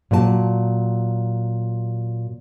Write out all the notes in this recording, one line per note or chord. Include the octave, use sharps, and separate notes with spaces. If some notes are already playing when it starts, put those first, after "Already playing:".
A#2 F#3 B4 A5